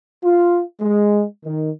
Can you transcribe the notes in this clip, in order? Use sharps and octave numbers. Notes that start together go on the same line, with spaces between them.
F4
G#3
D#3